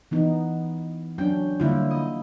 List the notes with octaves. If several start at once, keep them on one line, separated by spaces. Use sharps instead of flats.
E3 B3 D#4
F#3 C#4 D4 G5
D3 G3 A#3 E4 F4
D#5